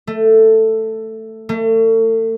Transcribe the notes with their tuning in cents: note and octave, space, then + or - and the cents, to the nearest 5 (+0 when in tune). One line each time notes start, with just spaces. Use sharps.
A3 +10
A3 +35